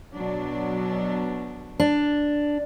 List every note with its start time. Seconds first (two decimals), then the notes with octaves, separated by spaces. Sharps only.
0.13 B2 F#3 D4
1.80 D4